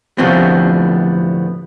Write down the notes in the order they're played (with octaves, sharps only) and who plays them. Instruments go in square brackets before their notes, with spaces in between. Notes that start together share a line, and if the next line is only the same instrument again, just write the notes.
[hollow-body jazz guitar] D2 A2 C3 F3 B3 C4